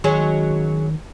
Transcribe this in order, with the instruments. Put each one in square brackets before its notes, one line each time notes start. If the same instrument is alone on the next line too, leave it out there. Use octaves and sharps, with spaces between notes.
[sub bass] D#3 [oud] F#3 G#3 C#4